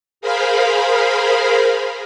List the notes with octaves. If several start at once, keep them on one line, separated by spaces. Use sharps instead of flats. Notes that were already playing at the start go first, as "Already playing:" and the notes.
G#4 A#4 C5 F5 B5